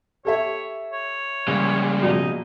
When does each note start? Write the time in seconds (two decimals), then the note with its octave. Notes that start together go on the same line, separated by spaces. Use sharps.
0.25 G4 A4 C#5 E5
0.92 C#5
1.48 C#3 E3 G3 G#3 A#3
2.02 A#1 B2 D#4